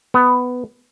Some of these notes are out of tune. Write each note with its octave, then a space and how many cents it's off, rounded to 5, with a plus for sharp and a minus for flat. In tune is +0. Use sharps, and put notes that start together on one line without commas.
B3 +10